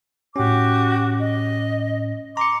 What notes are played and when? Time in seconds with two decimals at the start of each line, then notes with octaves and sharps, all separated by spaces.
0.36 A2 C#4 F#4 G4 D6
1.20 D#5
2.37 A#5 C6 D6 C#7